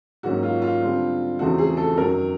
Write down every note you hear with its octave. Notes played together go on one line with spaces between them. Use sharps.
G#2 D#3 F#3 A#3 C#4 F#4
F4
F4
D3 G3 C4
E2 C#3 F3 A3 C4 F#4
G#4
A4
F#2 D#3 F#3 A#4